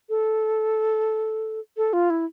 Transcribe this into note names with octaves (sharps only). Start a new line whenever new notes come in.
A4
A4
F4
E4